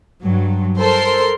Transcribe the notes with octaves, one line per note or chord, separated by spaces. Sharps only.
G2 F#3
A4 A#4 C5 C6